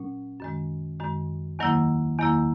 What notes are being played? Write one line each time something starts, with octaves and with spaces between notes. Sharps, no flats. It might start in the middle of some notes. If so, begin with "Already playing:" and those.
Already playing: A#2 F#3 C#4
F#2 D#3 G#3
F#2 D#3 G#3
E2 D#3 F#3 A#3 E4
E2 D#3 F#3 A#3 E4